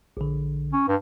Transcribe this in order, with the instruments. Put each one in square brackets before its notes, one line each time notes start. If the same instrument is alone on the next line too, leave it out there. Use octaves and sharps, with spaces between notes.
[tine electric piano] A#1 D3
[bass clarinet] C#4
G2